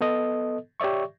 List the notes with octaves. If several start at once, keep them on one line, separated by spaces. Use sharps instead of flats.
B3 A4 D#5
G4 C#5 D5 E5 C#6